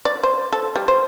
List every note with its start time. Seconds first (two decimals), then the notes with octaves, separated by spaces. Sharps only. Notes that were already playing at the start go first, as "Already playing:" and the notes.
0.05 D5
0.23 C5
0.52 A4
0.76 G3
0.88 C5